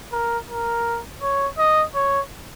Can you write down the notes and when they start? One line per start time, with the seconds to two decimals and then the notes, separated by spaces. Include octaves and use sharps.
0.12 A#4
0.49 A#4
1.22 C#5
1.58 D#5
1.95 C#5